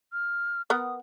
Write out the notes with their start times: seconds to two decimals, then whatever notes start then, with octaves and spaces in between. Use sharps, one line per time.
0.13 F6
0.70 B3 A#4 F#5 D#6